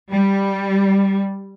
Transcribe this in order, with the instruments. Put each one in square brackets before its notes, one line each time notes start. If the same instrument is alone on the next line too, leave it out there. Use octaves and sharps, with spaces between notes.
[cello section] G3